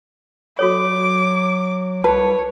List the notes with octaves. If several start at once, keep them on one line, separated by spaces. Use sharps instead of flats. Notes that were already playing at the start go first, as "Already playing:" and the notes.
F#3 F#4 A4 C#5 D6
C2 B4 C#5 A5